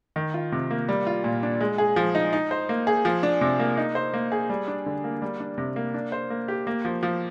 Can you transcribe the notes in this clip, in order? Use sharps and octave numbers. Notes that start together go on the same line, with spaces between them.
D#3
F4
C3
A#3
G3
F4
A#2
D4
G#3
G#4
F3
D#4
D#4
C5
A#3
G#4
F3
D4
C3
A#3
D#4
C5
A#3
G#4
G3
D4
D3
A#3
G3
D4
C3
A#3
D4
C5
A#3
G4
A#3
F3
F3